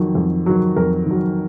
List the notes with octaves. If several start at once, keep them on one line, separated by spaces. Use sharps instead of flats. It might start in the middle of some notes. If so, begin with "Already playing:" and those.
Already playing: F2 D#3 F#3
F2
D#3 F#3
F2 A#4
D#3 F#3